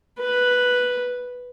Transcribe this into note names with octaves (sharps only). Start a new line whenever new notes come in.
B4